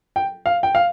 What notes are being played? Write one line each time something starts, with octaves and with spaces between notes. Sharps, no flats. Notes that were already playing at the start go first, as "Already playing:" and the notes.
G5
F5
G5
F5